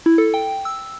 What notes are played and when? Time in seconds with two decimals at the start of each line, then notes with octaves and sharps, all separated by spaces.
0.06 E4
0.18 A4
0.34 G5
0.65 E6